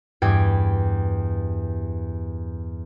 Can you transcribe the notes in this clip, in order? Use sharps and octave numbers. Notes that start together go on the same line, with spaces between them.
E2 G2 G4 G5 G#6